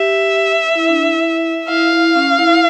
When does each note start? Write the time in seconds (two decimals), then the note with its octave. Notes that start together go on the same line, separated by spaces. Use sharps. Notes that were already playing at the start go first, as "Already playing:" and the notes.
Already playing: G4 E5
0.75 E4
0.89 D4
1.03 E4
1.69 E4 F5
1.93 E4
2.16 C#4
2.39 E4